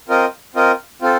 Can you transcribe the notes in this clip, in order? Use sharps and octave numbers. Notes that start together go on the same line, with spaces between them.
C4 F4 A#4 D#5
C4 F4 A#4 D#5
C4 F4 A4